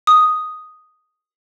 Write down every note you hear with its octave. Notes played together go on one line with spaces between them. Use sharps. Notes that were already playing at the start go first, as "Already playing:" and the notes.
D#6